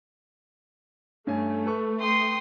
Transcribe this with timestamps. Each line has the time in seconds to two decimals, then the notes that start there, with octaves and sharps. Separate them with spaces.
1.27 G2 A3 C#4 G#5
1.66 A4 B4 C#6
1.98 G5 C6 D#6